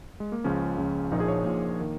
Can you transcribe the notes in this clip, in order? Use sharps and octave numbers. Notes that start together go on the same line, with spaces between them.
G#3
A#3
C#2 C#3 F3 C#4
C#2 C#3 F3
A#1 A#2 F3 D#4
G#4
C#5
A#1 A#2 F3 A#3
D#3